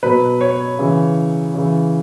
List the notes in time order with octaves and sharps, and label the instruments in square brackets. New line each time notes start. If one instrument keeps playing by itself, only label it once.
[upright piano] B2 F#3 B4
C#5
C#3 E3
C#3 E3